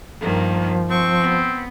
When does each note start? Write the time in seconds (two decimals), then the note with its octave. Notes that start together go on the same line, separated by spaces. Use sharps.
0.21 G2 D#3 F3 A#3
0.91 C4 C#6
1.21 B3